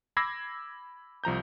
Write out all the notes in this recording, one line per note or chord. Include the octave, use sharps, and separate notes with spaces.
B5 D6 E6 G#6 A#6 C7
C2 F3 A#5 G6